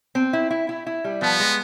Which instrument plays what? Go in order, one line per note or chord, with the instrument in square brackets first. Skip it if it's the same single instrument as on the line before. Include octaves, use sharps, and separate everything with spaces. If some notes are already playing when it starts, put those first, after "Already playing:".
[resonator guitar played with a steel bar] C4
E4
E4
E4
E4
G3
[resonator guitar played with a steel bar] F3 [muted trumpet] B3
[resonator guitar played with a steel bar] G#3